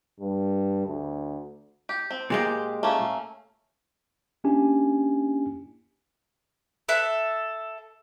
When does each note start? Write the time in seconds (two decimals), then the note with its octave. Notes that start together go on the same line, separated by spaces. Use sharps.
0.20 G2
0.87 D2
1.89 G4
2.11 C4
2.30 A#2 G#3 G4
2.83 A3 A#3 C#4
4.44 A#3 C#4 D4 E4 G4 G#5
6.89 A4 E5 F#6